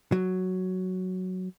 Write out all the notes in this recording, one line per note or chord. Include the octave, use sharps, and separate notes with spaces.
F#3